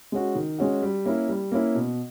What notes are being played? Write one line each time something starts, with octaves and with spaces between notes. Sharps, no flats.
G#3 C#4 F#4
D#3
G#3 C#4 F#4
G3
A#3 C#4 E4
G3
A#3 C#4 E4
B2